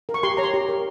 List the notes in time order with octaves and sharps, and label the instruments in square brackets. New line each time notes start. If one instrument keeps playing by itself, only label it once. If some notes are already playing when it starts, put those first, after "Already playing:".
[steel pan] A#4
C#6
G4 C6
C#5 A#5
C6
G4
A#4